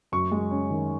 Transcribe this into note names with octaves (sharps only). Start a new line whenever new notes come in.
F#2 C#6
G#3
C#4
D#3